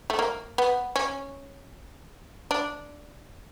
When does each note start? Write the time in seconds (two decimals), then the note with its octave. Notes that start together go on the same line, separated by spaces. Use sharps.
0.10 A3
0.19 A#3
0.58 B3
0.96 C#4
2.51 D4